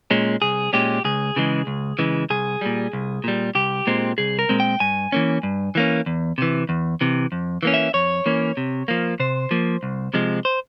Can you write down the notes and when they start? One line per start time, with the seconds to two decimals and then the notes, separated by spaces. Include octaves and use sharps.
0.11 A#2 G#3 C#4
0.42 C2 G#4
0.73 A#2 G#3 C#4 G4
1.05 C#2 G#4
1.36 C#3 E3 G#3
1.67 C#2
1.99 C#3 E3 G#3
2.30 C2 G#4
2.61 A#2 G3
2.93 C2
3.24 A#2 G3
3.55 C2 G4
3.87 A#2 G#3 C4
4.18 C2 G#4
4.39 A#4
4.49 A#2 G#3 C4
4.60 G5
4.80 G2 G#5
5.12 E3 A#3 C#4
5.43 G2
5.75 E3 A#3 C#4
6.06 E2
6.38 C3 E3
6.69 E2
7.01 C3 E3
7.32 F2
7.63 E3 A#3 C#4
7.74 E5
7.94 F2 C#5
8.26 E3 A#3 C#4
8.57 C3
8.88 F3 A#3
9.20 C3 C5
9.51 F3 A#3
9.83 C2
10.14 C3 F3 G#3
10.45 C5